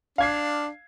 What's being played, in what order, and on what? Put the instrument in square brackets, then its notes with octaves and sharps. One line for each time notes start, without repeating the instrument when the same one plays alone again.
[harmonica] D4 [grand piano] F5 G#6 C7